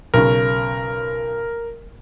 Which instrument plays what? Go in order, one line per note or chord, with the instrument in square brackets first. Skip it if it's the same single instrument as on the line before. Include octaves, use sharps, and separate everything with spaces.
[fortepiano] B1 C#3 [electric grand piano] A#4